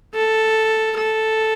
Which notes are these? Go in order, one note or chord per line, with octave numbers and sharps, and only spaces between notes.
A4
A4